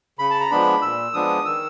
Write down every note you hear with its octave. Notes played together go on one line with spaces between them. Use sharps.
C#3 B5
A5
A#5
F3 G#3 B3 D4 B5
A#2 E6
F3 G#3 B3 D4 D#6
D#3 E6